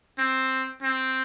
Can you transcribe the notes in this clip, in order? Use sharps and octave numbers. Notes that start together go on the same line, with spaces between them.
C4
C4